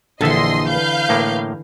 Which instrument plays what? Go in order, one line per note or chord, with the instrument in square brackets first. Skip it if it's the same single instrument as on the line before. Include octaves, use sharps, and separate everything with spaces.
[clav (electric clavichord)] A#1 A4 E5 [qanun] D3 E3 [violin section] D#5 C6
[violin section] B4 F5 G6
[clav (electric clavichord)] A2 A#3